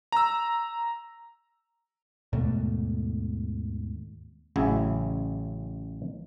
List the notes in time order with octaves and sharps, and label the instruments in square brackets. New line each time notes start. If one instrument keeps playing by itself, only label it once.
[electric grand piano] A#5 E6
[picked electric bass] D#2 G#2 B2 A3
[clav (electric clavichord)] A1 C#3 F#3 E4 G#5